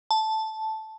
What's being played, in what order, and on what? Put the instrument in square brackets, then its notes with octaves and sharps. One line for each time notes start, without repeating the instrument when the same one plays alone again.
[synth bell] A5